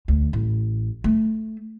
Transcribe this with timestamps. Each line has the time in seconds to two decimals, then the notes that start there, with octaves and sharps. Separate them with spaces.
0.08 D2
0.33 A1
1.04 A3